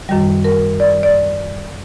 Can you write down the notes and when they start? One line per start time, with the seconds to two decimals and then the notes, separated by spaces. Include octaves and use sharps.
0.09 F#2 D#3 G3
0.44 A#4
0.80 D5
1.03 D5